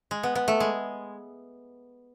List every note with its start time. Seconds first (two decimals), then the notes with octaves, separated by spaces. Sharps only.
0.11 G#3
0.23 B3
0.35 B3
0.48 A3
0.60 G#3